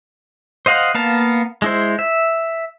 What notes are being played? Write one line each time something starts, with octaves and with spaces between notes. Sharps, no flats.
C5 D#5 F5 F#5
A#3 B3 F5 A5
G#3 E4 C5
E5